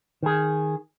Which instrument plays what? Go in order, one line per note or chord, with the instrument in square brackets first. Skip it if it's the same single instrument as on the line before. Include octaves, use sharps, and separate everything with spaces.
[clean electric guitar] D#3 G#4